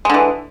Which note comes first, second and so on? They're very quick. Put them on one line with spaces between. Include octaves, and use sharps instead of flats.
G#3 D3 E3